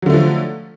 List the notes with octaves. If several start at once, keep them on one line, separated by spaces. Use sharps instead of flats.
D3 F3 F#3 A3